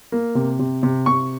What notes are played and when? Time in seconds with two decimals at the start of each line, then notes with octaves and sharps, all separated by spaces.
0.12 A#3
0.35 C3
0.59 C3
0.83 C3
1.06 C3 C#6